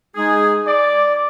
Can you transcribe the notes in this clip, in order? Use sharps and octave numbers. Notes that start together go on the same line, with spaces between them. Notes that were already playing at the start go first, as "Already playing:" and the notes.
G#3 D#4 G#4
D5 D6